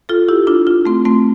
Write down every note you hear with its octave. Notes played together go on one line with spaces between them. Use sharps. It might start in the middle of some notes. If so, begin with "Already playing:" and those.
F4 A4
E4 G4
D4 F4
D4 F4
A3 C4
A3 C4